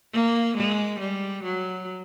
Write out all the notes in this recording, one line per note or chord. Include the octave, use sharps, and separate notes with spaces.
A#3
G#3
G3
F#3